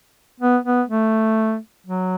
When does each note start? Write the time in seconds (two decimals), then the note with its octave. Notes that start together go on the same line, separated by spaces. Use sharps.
0.40 B3
0.65 B3
0.89 A3
1.87 F#3